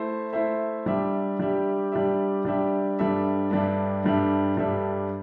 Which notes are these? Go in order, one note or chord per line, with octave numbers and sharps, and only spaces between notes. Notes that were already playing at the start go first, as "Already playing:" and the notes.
Already playing: A3 E4 C5 E5
A3 E4 C5 E5
G3 D4 G4 E5
G3 D4 G4 E5
G3 D4 G4 E5
G3 D4 G4 E5
G2 G3 D4 A4 E5
G2 G3 D4 A4 E5
G2 G3 D4 A4 E5
G2 G3 D4 A4 E5